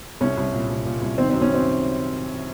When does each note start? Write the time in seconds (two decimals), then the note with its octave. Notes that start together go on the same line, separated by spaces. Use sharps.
0.20 C2 C#4
0.37 C2
0.53 A#2
0.69 C2
0.85 A#2
1.01 C2
1.18 D#3 C4
1.30 C4
1.34 F#2
1.42 C#4
1.50 F#2 C4